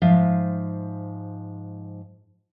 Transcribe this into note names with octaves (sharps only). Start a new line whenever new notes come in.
G#2 F3 E5 F5